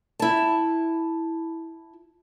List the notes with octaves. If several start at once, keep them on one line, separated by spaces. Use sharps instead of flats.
E4 A5